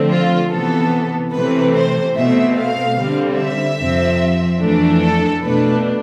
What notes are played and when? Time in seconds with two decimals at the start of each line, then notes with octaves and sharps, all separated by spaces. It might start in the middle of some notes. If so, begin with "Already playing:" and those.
Already playing: D3 F3 A3 C4
0.11 F4
0.52 C3 E3 B3 A4
1.33 C3 E3 A3 C4 B4
1.74 C5
2.15 B2 A3 C4 E5
2.56 F5
2.97 D3 G3 C4
3.38 E5
3.79 F2 C3 F3 C4
4.60 F2 E3 A3 D4
5.01 A4
5.42 B2 A3 D4 B4